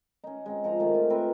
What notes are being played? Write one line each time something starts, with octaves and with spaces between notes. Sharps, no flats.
C#4 D#4
G#3 C4 D#4
F3 D#4 A#5
D#3 A3 F4
F4
C4 A#4 B4